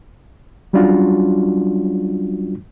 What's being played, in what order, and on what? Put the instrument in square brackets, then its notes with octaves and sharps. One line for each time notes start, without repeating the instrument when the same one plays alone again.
[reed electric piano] F#3 G3 C#4 D4 F4 F#4